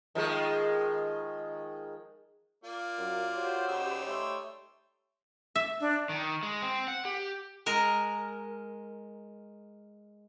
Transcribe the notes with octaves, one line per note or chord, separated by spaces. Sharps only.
D#3 F3 G#3
A#3 F4 D5
F#2
F#4 G4 C5 C#5
C#3 G3 D#4 E6
A3 C#5 E5 C6
E5
D4
D#3
G#3
C4
F#5
G4
G#3 A#4